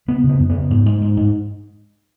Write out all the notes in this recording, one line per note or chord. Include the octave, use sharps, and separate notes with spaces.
C#3 B3
C#3
B3
F#2
C#3 B3
G#2
G#2
G#2
G#2